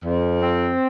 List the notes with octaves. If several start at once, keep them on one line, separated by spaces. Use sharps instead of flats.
F2
C4